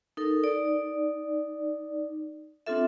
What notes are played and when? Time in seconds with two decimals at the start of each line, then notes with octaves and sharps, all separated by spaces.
0.17 D#4 A4 A#4
0.43 D#4 D5
2.66 C4 D4 F4 A4 E5